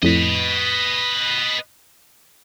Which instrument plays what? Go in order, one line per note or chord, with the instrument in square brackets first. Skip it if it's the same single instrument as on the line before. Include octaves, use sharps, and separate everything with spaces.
[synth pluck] F2 A2 [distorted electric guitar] B4 D#5